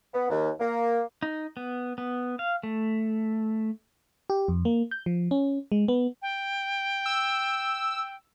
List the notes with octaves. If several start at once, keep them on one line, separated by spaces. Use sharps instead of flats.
B3
D#2
A#3
D#4
B3
B3
F5
A3
G4
F2
A#3
G6
F3
C#4
G#3
B3
G5
E6